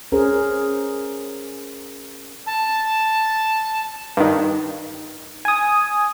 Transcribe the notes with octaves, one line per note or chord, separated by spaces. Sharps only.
C#4 G#4 A#4 C5
A5
G2 D#3
G#5 D#6